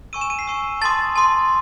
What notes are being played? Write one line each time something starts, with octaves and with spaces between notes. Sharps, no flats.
G#5 C#6 E6 D#7
E7
D#7
C7
G#5 C#6 E6
A5 C6 D#6 A6
A5 C6 D#6